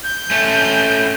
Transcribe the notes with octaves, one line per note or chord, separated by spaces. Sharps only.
G6
A3 C#4